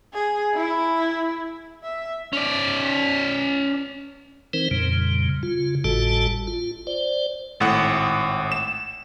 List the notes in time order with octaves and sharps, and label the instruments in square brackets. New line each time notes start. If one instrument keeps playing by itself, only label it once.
[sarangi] G#4
E4
E5
[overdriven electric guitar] C#4 D5
[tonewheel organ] E3 C4 D#4 A#4 C5
F2 A#2 C#3 G3
C#3 F4
G#1 A2 G3 F#4 A4 A5
F4
C5 D5
[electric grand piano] G#1 A2 F#5
E7